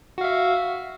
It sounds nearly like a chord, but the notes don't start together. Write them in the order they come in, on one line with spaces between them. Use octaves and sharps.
F#4 F5 E5